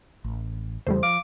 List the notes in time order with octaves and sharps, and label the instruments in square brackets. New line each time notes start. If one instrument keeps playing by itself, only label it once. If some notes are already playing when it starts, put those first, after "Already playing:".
[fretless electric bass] A1
[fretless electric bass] E2 C#3 [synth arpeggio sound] G3 A3 C5
[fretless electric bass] F3 [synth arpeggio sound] F5 [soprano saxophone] D6